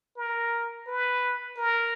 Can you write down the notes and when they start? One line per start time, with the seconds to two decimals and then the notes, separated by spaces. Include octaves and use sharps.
0.17 A#4
0.87 B4
1.57 A#4